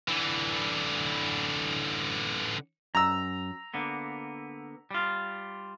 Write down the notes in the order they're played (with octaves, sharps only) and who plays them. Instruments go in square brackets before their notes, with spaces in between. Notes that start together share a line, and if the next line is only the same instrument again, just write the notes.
[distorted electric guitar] D3 E3
[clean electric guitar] F#2 [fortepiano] A#5 E6
[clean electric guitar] D3 A#3 B3
G3 F4